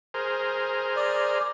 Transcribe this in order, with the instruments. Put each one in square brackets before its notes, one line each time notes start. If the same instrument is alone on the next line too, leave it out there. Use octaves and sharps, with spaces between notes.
[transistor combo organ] G#4 A#4 C5
[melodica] D5